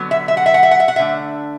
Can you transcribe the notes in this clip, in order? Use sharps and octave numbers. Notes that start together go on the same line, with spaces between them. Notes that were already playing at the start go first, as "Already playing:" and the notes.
Already playing: D3 F#3 B3
E5
E5
F#5
E5
F#5
E5
F#5
E5
F#5
D3 A3 D4 E5